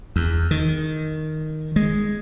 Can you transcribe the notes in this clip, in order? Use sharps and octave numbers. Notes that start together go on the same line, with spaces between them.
E2
D#3
G#3